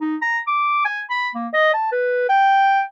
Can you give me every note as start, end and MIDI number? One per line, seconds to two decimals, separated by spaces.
0.01 0.16 63
0.22 0.39 82
0.47 0.83 86
0.84 1.01 80
1.10 1.29 83
1.35 1.48 58
1.53 1.73 75
1.74 1.88 81
1.92 2.27 71
2.29 2.82 79